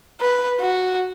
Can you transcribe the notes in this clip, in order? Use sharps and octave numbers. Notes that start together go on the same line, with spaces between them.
B4
F#4